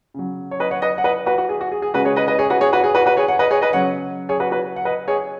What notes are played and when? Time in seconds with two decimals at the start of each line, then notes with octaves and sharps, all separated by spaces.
0.14 C#3 F#3
0.51 C#5
0.60 B4 D#5
0.71 C#5 F#5
0.82 B4 D#5
0.98 F#5
1.04 B4 D#5
1.26 F#4 B4
1.38 F#4
1.49 G#4
1.61 F#4
1.72 G#4
1.82 G#4
1.94 C#3 G#3 F#4 B4
2.05 G#4 C#5
2.16 B4 D#5
2.28 B4 D#5
2.39 G#4 C#5
2.50 F#4 B4
2.61 G#4 C#5
2.73 F#4 B4
2.84 G#4
2.95 F#4 B4
3.06 F#4 B4
3.17 G#4 C#5
3.28 C#5 F#5
3.39 B4 D#5
3.51 G#4 C#5
3.62 B4 D#5
3.73 C#3 F#3 C#5 F#5
4.29 G#4 C#5
4.40 F#4 B4
4.51 F#4 B4
4.76 F#5
4.85 B4 D#5
5.08 G#4 C#5